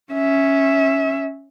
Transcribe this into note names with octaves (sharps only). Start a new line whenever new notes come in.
C#4 E5